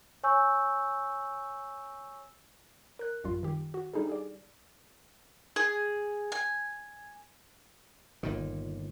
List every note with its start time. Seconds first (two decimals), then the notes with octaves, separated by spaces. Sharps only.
0.23 C#5 G#5 C#6 E6 G6
2.99 A#4 F#6
3.24 A1 F#2 G3 F4 C6
3.43 D#3 G4
3.74 F#4
3.94 G3 D4 D#4 G#4 A4
4.07 G4 G#4 D5
5.56 G#4
6.32 G#5
8.23 G1 A#2 D#3